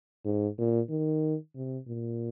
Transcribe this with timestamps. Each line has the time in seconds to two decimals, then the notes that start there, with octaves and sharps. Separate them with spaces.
0.25 G#2
0.58 A#2
0.90 D#3
1.55 C3
1.88 A#2